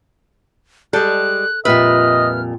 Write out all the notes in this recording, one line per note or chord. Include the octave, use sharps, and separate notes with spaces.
G3 G#3 A4 F#6
F2 A#2 G3 B4 D#5 E5 F6